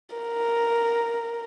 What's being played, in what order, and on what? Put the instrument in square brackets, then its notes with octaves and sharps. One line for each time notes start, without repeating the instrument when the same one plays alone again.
[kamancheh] A#4